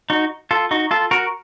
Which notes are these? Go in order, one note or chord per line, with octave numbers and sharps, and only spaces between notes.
D#4 F#4
F4 A4
D#4 F#4
F4 A4
F#4 A#4